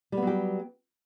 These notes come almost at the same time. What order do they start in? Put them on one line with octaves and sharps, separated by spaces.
G3 B3 F#3 G4